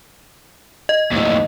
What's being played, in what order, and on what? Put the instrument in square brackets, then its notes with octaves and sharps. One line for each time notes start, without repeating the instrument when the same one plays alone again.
[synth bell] D#5
[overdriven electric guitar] D#2 A2